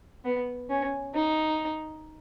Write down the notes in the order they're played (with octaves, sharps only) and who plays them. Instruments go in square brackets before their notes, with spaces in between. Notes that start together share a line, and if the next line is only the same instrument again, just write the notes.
[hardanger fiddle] B3
C#4
D#4